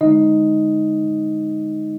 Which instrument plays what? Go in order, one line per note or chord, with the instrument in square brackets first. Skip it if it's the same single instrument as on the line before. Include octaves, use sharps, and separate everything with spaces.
[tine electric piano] D3 G#3 D#4 D#5